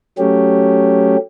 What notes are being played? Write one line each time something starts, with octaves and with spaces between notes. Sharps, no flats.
F#3 A3 C#4 G4